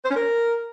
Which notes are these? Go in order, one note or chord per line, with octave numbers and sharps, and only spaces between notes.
C5
C#4
A#4